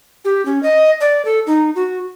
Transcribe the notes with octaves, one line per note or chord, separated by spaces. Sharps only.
G4
C#4
D#5
D5
A4
D#4
F#4